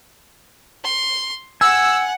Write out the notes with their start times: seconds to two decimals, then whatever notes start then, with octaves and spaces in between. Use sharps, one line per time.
0.83 C6
1.61 F#5 G#5 E6